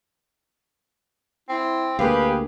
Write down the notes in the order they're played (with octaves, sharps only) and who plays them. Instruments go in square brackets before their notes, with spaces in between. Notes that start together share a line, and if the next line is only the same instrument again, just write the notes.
[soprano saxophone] C4 [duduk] E4
[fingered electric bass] D2 A#3 [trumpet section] G4 B4 [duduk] G#4 [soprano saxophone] F5